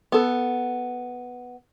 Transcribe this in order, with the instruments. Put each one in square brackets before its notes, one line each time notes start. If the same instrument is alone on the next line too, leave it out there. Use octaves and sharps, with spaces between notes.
[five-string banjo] B3 A4